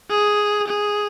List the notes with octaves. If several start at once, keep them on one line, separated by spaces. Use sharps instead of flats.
G#4
G#4